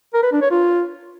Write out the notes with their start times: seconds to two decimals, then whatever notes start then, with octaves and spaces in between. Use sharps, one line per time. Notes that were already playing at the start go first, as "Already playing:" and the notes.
0.14 A#4
0.23 B4
0.32 D4
0.42 C#5
0.51 F4